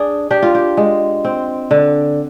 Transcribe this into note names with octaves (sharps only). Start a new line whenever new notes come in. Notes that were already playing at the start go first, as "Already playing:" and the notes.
Already playing: D4 G#4
D4 G4
F4
G4
G#3
C4
D3